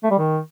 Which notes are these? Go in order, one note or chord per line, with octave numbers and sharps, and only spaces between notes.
A3
G3
D#3